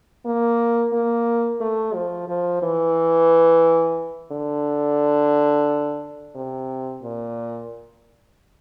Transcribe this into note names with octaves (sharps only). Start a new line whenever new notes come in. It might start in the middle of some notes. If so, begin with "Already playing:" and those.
A#3
A#3
A3
F3
F3
E3
D3
C3
A#2